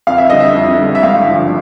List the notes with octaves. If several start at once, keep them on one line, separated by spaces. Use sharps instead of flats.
F2 F5
E5
D3 G3 D#5
E5
F2
D3 G3
E5
G#1 F5
G2 D3 F3